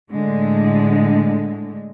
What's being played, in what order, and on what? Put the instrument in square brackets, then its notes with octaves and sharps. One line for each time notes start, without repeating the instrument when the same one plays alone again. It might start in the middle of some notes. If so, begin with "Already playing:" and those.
[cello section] A2 D3 G#3